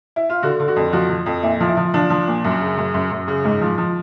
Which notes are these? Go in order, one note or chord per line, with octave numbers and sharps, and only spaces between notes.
E4
F4
D3 F#4
D3
F#4
F2
F3 F#4
F3
F2
A#2 E4
F3
E4
F3
F3 D4
F3
A#2
F#2
C#3
F#2
F#2
F#2
C#3
G#2
F3
F3